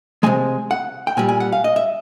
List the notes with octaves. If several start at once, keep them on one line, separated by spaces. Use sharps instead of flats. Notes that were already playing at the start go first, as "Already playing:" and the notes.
C3 F3 G#3 G#5
F#5
G5
A#2 G3 G#5
G#5
F#5
F5
D#5
E5